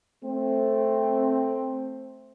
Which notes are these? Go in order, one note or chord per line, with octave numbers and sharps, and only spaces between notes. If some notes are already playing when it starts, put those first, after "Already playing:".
A3 C4